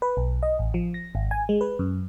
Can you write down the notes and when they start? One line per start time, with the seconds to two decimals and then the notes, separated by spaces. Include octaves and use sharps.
0.02 B4
0.17 B1
0.43 D#5
0.59 A1
0.74 F3
0.94 A#6
1.15 G#1
1.31 G#5
1.49 G#3
1.61 B4
1.79 F#2